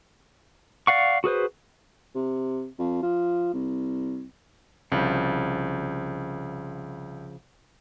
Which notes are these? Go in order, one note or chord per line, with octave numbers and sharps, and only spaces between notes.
D5 F5 F#5 C#6
F#4 G#4 B4 C5
C3
F2
F3
C2
C2 C#3 F3